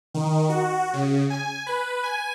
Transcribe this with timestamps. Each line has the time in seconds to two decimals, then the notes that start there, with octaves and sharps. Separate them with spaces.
0.14 D#3
0.49 F#4
0.93 C#3
1.30 G#5
1.67 B4
2.03 G#5